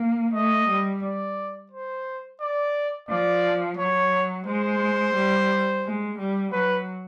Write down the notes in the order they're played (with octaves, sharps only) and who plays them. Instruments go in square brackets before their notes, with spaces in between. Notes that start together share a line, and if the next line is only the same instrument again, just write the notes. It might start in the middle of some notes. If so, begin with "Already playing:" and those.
Already playing: [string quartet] A#3
[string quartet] A3 [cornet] D#5
[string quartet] G3
[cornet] D5
C5
D5
[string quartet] F3 [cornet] D5
[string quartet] F#3 [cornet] C#5
[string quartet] G#3 [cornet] C5
[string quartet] G3
G#3
G3
[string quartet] F#3 [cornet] B4